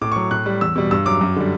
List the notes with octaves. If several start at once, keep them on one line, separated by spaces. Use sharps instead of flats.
A2 D6
F#3 C#6
A2 F#6
G3
E2 E6
B2 G3
G2 E6
F#3 D6
F#2
D3 G3